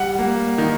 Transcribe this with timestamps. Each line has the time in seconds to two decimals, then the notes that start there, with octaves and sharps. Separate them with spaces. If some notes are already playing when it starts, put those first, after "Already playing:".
Already playing: G3 F#5
0.19 A#3
0.58 D#3